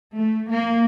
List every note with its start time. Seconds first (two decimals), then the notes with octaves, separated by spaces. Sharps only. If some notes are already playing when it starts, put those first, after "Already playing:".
0.15 A3
0.48 A#3